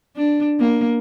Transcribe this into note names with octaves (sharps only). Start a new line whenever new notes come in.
D4
A#3